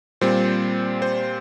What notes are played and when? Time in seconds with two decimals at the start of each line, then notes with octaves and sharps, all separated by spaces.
0.21 A#2 G3 C4 C5
1.02 C5